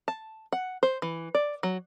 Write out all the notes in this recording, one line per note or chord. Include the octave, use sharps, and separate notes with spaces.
A5
F#5
C5
E3
D5
F#3